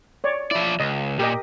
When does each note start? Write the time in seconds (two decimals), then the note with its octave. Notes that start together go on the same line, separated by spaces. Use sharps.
0.24 C#5 D5
0.51 F3 E4 D5
0.80 C#2 D#5
1.19 A#2 G4 A#4 D#5